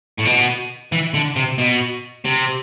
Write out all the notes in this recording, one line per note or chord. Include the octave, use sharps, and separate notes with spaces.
A2
B2
E3
D3
C3
B2
C3